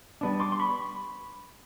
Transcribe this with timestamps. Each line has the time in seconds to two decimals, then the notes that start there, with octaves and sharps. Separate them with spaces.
0.21 G3 B3 D4
0.40 C6 D6
0.52 C6
0.60 B5 C#6